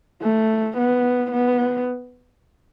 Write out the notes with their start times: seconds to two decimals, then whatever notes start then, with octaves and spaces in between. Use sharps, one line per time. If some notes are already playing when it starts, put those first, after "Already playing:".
0.22 A3
0.78 B3
1.32 B3